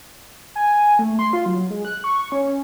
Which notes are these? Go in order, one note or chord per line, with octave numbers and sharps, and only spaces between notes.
G#5
A3
C6
F4
F#3
G#3
F#6
C#6
C#4